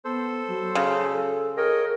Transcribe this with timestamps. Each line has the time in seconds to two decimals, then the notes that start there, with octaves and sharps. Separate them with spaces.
0.05 B3 A4 C5
0.48 F#3
0.75 C#3
1.12 A4
1.57 G#4 A#4 C#5 D#5 G5